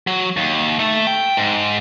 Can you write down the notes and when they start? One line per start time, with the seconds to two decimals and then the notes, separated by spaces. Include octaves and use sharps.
0.07 F#3
0.37 D#2
0.79 A3
1.07 G5
1.37 G#2